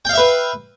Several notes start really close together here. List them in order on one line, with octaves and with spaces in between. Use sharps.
G5 F5 E5 B4